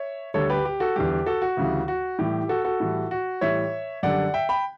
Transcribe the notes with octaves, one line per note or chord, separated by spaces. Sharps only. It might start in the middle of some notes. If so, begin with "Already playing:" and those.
Already playing: C#5 E5
D2 D3 G3 A4 C#5
G4 B4
G4
F#4 A4
E2 D3 G3 G4
G4
F#4 A4
F#4
D2 C#3 E3 G3
F#4
A2 E3 G3 G4
F#4 A4
F#4 A4
A2 E3 G3
F#4
A2 E3 G3 C#5 E5
F#2 D3 G3 D5 F#5
E5 G5
G5 B5